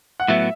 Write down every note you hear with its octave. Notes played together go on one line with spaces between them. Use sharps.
F#5
A2 F#3 B3 E5